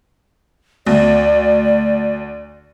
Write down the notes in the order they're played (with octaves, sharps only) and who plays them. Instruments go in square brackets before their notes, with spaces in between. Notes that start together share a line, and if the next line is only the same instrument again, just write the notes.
[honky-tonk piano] D2 [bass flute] D5